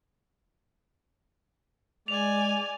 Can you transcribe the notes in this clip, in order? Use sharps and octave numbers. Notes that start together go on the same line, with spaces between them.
G#3 D5 G#5 F7